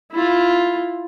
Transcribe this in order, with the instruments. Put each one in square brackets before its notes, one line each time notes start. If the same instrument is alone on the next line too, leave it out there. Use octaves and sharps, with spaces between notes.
[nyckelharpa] E4 F4